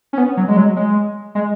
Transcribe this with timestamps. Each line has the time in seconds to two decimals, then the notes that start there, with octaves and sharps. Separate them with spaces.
0.13 C#4
0.18 B3
0.37 F#3
0.48 G#3
0.57 F#3
0.76 G#3
1.35 G#3